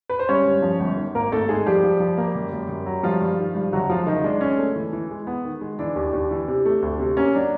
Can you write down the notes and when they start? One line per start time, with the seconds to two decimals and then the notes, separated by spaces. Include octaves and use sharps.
0.09 B4
0.19 C5
0.29 G2 C#4 C#5
0.46 G2
0.62 F3
0.80 G1
0.97 D#3
1.15 G#1 A#3 A#4
1.32 G#1 A3 A4
1.48 G#2 G#3 G#4
1.66 F3 G3 G4
1.84 F3
2.00 F3
2.18 A#3
2.35 F#2
2.53 F#2
2.69 F#2
2.86 F#3
3.03 G2 F3 F4
3.21 G2
3.39 D#3
3.55 G2
3.72 F#1 F#3 F#4
3.89 F3 G#3 F4
4.07 F#1 D#3 D#4
4.24 G#3 D4
4.41 C#4
4.59 A3
4.76 E3
4.93 E3
5.11 G#3
5.27 B3
5.45 D#3
5.61 G#3
5.79 E3 D4
5.96 D#2
6.13 D#2
6.31 E3
6.48 C3
6.65 A3
6.82 D2
7.00 C3
7.17 A#3 C#4
7.34 F#3 D4